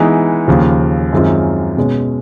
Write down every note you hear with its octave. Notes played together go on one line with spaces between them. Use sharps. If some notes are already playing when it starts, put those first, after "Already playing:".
Already playing: E3 G#3 B3 D#4
D#2 C#3 F3
F#2 D#3 G#3 C4 F4
B2 G#3 C#4